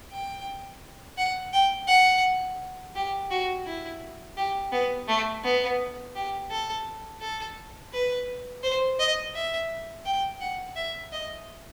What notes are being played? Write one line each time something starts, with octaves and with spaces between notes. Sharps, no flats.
G5
F#5
G5
F#5
G4
F#4
E4
G4
B3
A3
B3
G4
A4
A4
B4
C5
D#5
E5
G5
F#5
E5
D#5